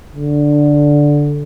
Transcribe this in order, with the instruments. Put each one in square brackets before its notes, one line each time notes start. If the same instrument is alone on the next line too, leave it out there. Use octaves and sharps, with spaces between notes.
[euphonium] D3